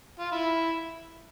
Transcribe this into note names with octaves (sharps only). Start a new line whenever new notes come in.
F4
E4